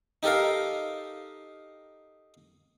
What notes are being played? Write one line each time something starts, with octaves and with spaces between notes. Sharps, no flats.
D#4 G4 A4 A#4 F5